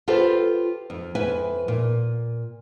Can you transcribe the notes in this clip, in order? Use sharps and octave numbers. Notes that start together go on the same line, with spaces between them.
F4 G4 A4 B4 C5 G5
F2
F2 B4 E5 G#5
A#2